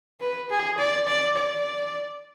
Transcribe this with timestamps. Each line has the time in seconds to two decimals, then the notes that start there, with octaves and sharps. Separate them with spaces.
0.20 B4
0.50 G#4
0.78 D5
1.07 D5
1.36 D5